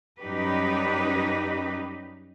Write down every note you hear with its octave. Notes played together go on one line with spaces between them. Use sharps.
F#2 G3 D#4 G4 B4